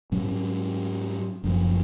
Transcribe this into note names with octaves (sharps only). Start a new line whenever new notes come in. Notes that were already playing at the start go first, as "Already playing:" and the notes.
G#2 F#3 C#4
F#1 F#2 C#3 F3